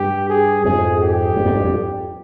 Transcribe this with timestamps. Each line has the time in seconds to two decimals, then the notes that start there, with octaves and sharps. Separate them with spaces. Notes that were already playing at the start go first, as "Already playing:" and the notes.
Already playing: G2 G4
0.29 G#4
0.64 F2 G#2 G#4
1.01 G4
1.36 G2
1.45 F2 G#2
1.55 G2
1.64 F2